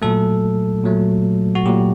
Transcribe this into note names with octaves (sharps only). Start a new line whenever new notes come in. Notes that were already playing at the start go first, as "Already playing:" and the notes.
A#2 F#3 A3 A4
A#2 F#3 A3
F#4
A#2 F#3 A3 G4